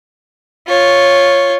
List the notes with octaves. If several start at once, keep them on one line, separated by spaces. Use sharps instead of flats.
F4 C#5